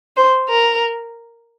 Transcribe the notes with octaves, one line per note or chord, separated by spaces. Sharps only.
C5
A#4